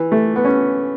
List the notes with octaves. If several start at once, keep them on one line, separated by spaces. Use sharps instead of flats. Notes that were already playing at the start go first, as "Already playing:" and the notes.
Already playing: E3
A3
B3
C#4